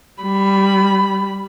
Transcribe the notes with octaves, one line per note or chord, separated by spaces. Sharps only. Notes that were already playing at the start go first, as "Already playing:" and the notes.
G3 B5